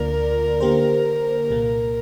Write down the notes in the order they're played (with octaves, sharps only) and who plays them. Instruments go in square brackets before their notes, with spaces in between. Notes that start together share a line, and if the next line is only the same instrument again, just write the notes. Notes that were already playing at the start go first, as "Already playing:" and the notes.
Already playing: [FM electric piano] D2 D3 A#3 F4 D5 [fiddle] A#4
[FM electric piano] D3 A#3 G4 C5
C2 A#2 A#3